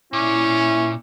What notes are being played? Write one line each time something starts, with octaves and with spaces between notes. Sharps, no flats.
A#2 C#4 E4